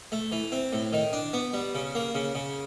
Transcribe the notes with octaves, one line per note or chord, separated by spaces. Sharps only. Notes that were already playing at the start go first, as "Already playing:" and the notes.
A3
E3
C4
A2
D#3
D4
B3
G3
C#3
A#3
C#3
C#3